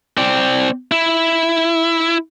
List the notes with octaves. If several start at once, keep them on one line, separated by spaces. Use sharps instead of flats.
C4 D5
E4